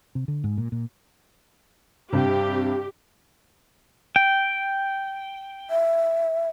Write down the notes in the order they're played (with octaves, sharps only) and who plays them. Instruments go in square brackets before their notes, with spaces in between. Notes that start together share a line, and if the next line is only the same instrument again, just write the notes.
[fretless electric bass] C3
D3
G#2
A#2
A#2
[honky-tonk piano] G2 C3 [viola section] G4
[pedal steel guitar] G5
[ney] E5